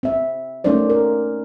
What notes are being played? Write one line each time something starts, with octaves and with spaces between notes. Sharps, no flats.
C4 E5
A3 A#3 C#4 D#4 C5 D5
A#4